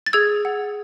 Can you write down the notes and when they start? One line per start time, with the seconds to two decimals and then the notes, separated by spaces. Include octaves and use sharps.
0.06 A6
0.13 G#4 E6 G#6
0.45 F#5